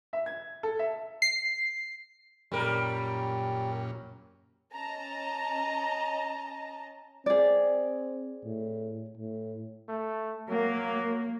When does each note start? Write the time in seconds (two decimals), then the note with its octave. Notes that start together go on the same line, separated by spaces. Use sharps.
0.13 E5
0.26 G#6
0.63 A4
0.79 E5
1.22 C7
2.52 F#2 A#2 G3 C#4 A#4
4.74 C#4 D#5 A5 A#5
7.26 C4 G#4 D5
8.45 A2
9.18 A2
9.89 A3
10.49 F#3 A#3